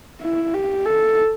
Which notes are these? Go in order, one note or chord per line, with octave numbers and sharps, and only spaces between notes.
E4
G4
A4